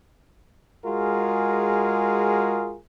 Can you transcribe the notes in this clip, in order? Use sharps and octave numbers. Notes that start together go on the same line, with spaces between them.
G#3 F4 F#4 G#4 A#4